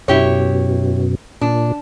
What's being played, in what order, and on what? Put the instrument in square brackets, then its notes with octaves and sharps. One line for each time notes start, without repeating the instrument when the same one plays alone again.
[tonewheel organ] F#2 B2 [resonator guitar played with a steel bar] E4 G4 C#5
[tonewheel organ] A#2 [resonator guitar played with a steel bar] D4